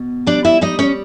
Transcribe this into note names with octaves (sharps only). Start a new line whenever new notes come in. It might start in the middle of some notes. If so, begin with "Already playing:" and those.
Already playing: B2
G3 D4 D5
E4 E5
G3 D#4 D#5
C#4 C#5